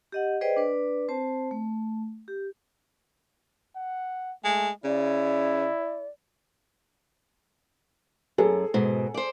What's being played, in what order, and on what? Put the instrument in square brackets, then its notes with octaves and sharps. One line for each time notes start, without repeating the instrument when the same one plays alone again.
[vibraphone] G4 D#5 F#5
G#4 B4 C5 D5 D#5 G5
D4 B4 D5
C4 C5 A5
A3
G4
[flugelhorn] F#5
[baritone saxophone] G#3 [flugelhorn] A3
[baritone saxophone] C#3 [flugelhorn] E4 [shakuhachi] D5
[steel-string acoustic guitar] F#2 [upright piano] G#4 A4
[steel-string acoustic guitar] G#2 B2
C5 D5